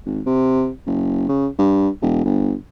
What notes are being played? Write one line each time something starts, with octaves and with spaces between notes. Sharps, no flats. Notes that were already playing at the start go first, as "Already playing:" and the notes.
G#1
C3
F#1
C#3
G2
E1
G1